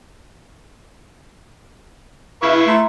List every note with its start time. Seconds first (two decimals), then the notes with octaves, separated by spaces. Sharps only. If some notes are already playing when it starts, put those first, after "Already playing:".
2.42 E4 B4 F5 C#6
2.67 A3 E5 A#5 C6